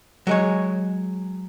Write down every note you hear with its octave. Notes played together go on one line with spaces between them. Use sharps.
F#3 G#3 C#5